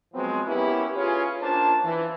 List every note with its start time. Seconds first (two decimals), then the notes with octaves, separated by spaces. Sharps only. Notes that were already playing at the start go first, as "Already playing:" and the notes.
0.13 F3 F#3 G#3 B3 C4
0.46 A#3 B3 C#4 E4 G4 B4
0.95 C#4 F4 G#4 B4 C#5
1.40 A#3 C#4 D4 F4 C5 A5
1.83 E3